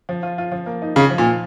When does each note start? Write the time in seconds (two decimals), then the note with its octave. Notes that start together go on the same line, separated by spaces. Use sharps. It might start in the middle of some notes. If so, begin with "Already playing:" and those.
0.09 F3
0.23 F4
0.38 F4
0.52 F3
0.66 A#3
0.82 D#4
0.96 C#3 F4
1.10 F3
1.18 A#2
1.26 F4